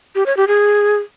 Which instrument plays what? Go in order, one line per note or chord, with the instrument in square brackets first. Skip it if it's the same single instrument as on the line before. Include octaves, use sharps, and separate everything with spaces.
[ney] G4
C#5
G4
G#4